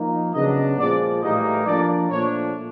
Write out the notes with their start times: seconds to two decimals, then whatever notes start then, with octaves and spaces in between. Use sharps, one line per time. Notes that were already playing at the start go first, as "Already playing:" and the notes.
Already playing: F3 A#3 D#4
0.34 C#3 F#3 B3 D4 D#5
0.78 A#2 F3 G#3 D5
1.22 A2 E3 G3 A#3 D#4 D#5
1.66 F3 A#3 D4 D5
2.09 A#2 F3 A3 D4 C#5